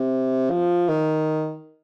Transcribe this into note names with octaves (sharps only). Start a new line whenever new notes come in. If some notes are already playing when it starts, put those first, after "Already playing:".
Already playing: C3
F3
D#3